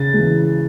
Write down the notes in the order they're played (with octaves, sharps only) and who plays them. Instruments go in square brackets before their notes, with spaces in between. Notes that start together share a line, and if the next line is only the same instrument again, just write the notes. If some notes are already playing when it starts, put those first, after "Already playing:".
Already playing: [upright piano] C#3 A6
E3 G#3